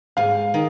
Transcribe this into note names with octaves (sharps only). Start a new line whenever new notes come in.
G#2 F5
D#3